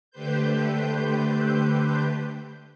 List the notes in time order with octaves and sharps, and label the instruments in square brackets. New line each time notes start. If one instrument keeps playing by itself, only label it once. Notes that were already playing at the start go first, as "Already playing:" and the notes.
[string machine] D3 A3 G4 B4 C5 G6